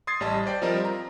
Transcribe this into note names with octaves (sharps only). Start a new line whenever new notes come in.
C6 D#6 G#6 A6 C7
A1 G3 D#5 A5
C5 D5 G5
F3 G3 C4 F4 A#4 D#5
A#5